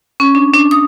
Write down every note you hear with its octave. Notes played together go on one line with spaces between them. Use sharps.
C#4
D4
D4
D#6